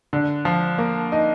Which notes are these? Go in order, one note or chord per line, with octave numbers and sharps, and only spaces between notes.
D3
F3
A#3
D#4